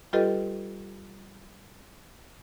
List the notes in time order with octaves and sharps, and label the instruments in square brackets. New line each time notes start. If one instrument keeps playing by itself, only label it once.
[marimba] G3 F4 G4 A4 B4 D#5